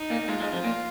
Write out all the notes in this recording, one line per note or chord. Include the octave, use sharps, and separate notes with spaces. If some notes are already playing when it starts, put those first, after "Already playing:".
Already playing: D#4
A#2 A#3
G#2 G#3 F4
G#2 G#3
F2 F3
A#2 A#3